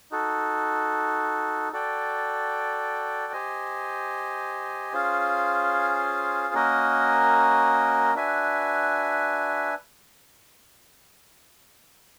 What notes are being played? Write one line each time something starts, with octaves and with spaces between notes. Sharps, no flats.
D#4 F#4 A4
F#4 A4 D5 G5
G4 C5 D#5 G#5
C#4 F4 G#4 C5 F5
A#3 C#4 F#4 A#4 D#5
D4 F#4 B4 E5 G#5